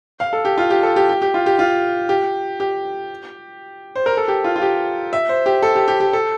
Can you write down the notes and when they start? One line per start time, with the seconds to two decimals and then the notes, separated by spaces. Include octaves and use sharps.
0.20 F5
0.33 A4
0.45 G4
0.58 F4
0.70 G4
0.83 A4
0.96 G4
1.09 G4
1.22 G4
1.34 F4
1.46 G4
1.59 F4
2.09 G4
2.60 G4
3.96 C5
4.06 A#4
4.17 A4
4.28 G4
4.44 F4
4.56 F4
4.62 G4
5.13 E5
5.29 C5
5.46 G4
5.63 A4
5.75 G4
5.88 G4
6.00 G4
6.13 A4